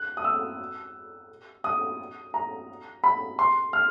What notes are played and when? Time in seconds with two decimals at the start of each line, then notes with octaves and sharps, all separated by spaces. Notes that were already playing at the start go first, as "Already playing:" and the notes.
Already playing: F#6
0.17 D#6
0.24 E6
1.64 D#6
2.34 A#5
3.04 B5
3.39 C6
3.73 F6